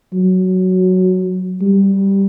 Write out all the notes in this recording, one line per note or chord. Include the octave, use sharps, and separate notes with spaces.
F#3
G3